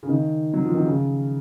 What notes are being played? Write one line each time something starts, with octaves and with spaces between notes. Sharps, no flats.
C#3
D#3
F#3
F3
D#3
C#3